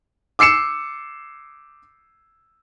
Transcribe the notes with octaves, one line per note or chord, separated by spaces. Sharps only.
D6 E6 C7 C#7 E7